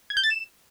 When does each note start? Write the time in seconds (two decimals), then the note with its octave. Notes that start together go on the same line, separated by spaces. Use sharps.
0.10 G#6
0.17 G6
0.23 A6
0.30 E7